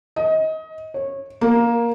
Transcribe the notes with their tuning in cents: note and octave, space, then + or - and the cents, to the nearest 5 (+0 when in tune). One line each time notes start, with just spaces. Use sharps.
D#5 +25
C#5 -20
A#3 +10